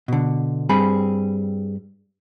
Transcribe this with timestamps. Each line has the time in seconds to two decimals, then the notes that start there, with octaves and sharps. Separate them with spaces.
0.08 B2 D3
0.69 G2 G3 C4 G#4 B5